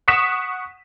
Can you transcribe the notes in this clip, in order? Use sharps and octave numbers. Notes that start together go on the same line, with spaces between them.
F#5 C#6 D#6 B6 E7